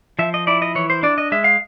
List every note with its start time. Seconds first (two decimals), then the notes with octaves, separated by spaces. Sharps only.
0.19 F3 E5
0.34 D#5
0.47 E4 D5
0.62 D#5
0.75 E3 C#5
0.90 C5
1.03 D4 D5
1.18 D#5
1.32 G#3 E5
1.44 F5